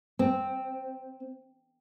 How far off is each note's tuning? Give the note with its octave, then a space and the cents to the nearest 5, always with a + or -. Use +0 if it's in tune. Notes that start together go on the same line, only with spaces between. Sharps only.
C4 +0